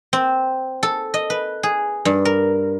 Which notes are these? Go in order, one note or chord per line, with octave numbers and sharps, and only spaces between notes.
C4
A4
D#5
B4
G#4
G2
A#4